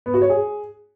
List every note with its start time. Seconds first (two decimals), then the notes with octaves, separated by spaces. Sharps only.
0.06 B3
0.14 F#4
0.22 C#5
0.30 G#4